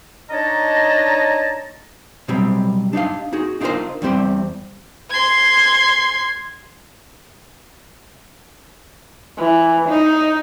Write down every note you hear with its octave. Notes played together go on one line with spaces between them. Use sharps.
D4 D#4 C#5 D#5 A5 A#5
B2 F#3 G3 C4
D4 D#4 G4 F5
D#4 F#4 G#4
D4 D#4 F4 G#4 A#4 C5
E2 G3 C4 G4 C5 D5
C6 G#6
E3
D#4